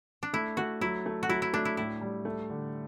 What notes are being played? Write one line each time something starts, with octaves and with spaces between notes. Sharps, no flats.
D4
A3 E4
A3 F#4
F#3 E4
A3
F#4
F#3 E4
E4
A3 D4
E4
A2 E4
G3
A3
D3